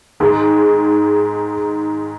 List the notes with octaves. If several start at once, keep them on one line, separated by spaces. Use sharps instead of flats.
G#2 D#3 G#3